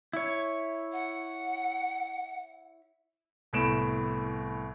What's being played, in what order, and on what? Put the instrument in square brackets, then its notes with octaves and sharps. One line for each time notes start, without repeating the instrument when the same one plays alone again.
[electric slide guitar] E4 C#5
[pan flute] F#5
[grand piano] C2 A2 B3 D7 E7